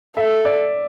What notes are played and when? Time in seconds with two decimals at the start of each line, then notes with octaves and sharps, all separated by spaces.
0.17 A4 E5
0.45 D5